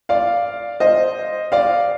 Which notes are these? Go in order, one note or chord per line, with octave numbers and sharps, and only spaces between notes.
D5 F5
C5 D#5
D5 F5